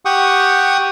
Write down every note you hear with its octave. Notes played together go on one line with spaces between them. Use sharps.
G4 F#5 G5 C#6 D#6